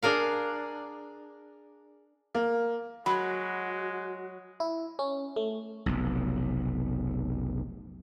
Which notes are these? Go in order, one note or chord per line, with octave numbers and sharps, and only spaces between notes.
D4 G#4 A#4 F5
A#3
F#3 G#3 F#4 B5
E4
C#4
A3
F1 B1